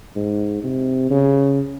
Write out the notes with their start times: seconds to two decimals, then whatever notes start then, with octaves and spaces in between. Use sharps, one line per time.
0.16 G#2
0.63 C3
1.10 C#3